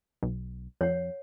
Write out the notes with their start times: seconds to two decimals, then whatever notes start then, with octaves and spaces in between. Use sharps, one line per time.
0.23 B1
0.81 F2 C#5 F#5